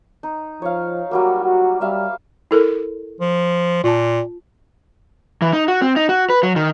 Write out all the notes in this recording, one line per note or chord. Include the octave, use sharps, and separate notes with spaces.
D#4
F3 C#5 F5
F#3 G3 A#3 F#4
F#4
G3 E5 F5
E4 A4 A#4
F3
A#2 F4 A5
E3
D#4
F#4
C4
D#4
F#4
B4
F#3
D#3